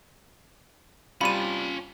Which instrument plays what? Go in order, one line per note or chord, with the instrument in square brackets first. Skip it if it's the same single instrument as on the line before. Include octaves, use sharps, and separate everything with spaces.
[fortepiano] C2 G3 [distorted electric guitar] C#4 A5 [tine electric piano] F4 C#7 [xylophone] B5 D#7